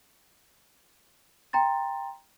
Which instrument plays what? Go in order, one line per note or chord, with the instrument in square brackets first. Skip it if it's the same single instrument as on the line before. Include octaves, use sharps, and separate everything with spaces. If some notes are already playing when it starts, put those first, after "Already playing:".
[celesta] G5 A#5 C6 A6